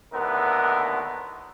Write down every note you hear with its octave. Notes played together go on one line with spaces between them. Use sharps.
D#2 A2 D3 B3 A#4